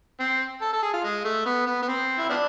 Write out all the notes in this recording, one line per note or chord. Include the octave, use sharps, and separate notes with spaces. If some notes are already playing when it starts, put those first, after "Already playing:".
C4
A4
A4
G#4
F4
G#3
A3
B3
B3
B3
C4
E4
F3 B3 D4